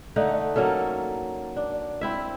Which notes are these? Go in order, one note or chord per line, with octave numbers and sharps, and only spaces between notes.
D3 A3 D#4 F#5
F#3 A#3 C#4 A4
D4
C4 E4 E5